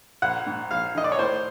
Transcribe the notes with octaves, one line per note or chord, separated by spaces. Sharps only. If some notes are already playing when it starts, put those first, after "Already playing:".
A#1 F#5
G#2
A#1 F5
D#3 D#5
D5
C#5
A2 C5